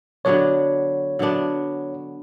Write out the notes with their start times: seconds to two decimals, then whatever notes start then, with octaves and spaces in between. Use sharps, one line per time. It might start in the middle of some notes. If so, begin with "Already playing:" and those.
0.25 D3 F#3 B3 D4 C#5
1.19 D3 F#3 B3 D4